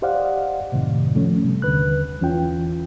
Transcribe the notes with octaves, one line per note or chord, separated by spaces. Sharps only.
G4 C5 D5 D#5 F5 F#5
F#2 A2 C3 D#3
F3 A3 C#4
C3 G3
D#2 D3 B4 F#6
E2 E3 C#4 F4 G5